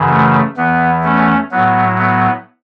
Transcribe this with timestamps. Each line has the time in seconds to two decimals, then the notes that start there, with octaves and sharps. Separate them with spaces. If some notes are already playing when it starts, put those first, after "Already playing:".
Already playing: F#2 C#3 E3
0.09 A3
0.57 E2 E3 B3
1.04 A3 C#4
1.51 A2 F#3 B3
1.98 B3